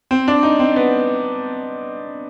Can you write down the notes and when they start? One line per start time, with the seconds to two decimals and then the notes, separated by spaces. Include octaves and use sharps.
0.11 C4
0.28 D4
0.43 D#4
0.60 C4
0.76 B3